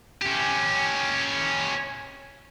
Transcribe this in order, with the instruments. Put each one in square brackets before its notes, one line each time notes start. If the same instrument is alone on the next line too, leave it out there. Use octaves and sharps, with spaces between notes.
[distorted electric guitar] C#4 G4